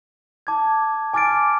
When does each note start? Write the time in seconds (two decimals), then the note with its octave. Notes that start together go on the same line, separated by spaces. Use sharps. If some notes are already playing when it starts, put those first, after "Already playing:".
0.47 A5 D6 G#6
1.14 G#5 D6 F6 A6 D7